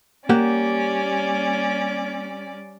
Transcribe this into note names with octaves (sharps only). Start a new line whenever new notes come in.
G3 A#3 C#4 G4 D5 F#5